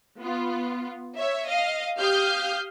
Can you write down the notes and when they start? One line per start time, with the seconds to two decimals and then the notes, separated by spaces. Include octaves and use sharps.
0.19 B3 F4
1.16 C#5 E5
1.48 D#5 F5
1.99 G4 F5 D#6 F6 G6